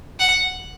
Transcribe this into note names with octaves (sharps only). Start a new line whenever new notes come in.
F#5